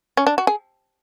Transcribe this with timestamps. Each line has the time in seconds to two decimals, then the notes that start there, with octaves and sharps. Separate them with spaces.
0.17 C#4
0.27 D4
0.38 F#4
0.47 G#4